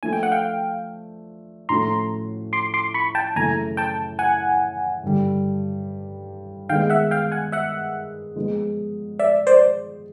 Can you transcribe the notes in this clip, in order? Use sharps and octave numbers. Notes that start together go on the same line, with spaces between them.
F3 A3 D4 F4 G#5
G5
F#5
F5 G5
A2 F3 A3 C#4 F#4 A#5 C6
C6 D6
C6 D6
B5 C#6
G5 A5
F#2 C#3 E3 A3 G#5 A#5
G5 A5
F#5 G#5
G2 D3 G3
D#3 G#3 B3 F5 G5
E5 F#5
F5 G5
F#5 G#5
E5 F#5
F3 G#3 B3
D5 E5
C5 D5